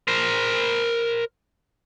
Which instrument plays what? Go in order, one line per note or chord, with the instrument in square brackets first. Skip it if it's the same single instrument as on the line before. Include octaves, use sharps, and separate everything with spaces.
[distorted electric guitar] A#4 C5